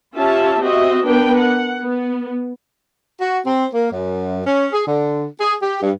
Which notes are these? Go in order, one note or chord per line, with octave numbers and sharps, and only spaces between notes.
C#4 F4 G4 E5 A5
C4 F#4 D#5 E5
B3 D4 A#4 B4 G5
F#5
B3
F#4
C4
A#3
F#2
C#4
G#4
D3
G#4
G4
G2